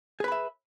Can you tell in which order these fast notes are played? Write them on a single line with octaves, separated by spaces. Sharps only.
G#4 B4 B5 E5